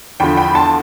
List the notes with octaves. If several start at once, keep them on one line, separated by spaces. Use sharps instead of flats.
E2 D3 F3 G5 B5
G5 B5
A5 C6